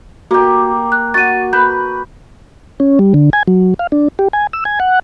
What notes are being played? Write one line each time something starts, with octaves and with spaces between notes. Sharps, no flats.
A#3 F#4 G4
F#6
F#4 A6 D#7
B4 B5 G6
C#4
G3
D3
G#5
F#3
F5
D4
G4
G#5
E6
G#5
F#5